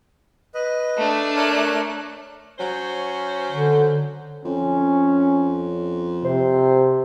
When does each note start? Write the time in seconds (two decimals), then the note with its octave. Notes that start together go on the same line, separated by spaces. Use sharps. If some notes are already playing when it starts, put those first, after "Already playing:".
0.54 B4 D#5
0.98 A3 D4
1.36 A#4 C#5 F#6
2.59 F#3 C#4 C5
3.51 D3
4.45 F2 C#4
6.25 C3 C5